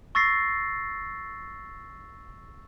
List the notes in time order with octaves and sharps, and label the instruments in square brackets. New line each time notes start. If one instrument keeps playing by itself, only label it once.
[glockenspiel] C#6 E6 A6 A#6 C7